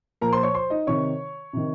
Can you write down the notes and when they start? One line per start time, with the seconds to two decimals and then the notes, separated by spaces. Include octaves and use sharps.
0.21 A#2 F3 A#4 A#5
0.33 C5 C6
0.43 C#5 C#6
0.55 C5 C6
0.70 D#4 D#5
0.87 C3 D#3 C#5 C#6
1.53 C3 D#3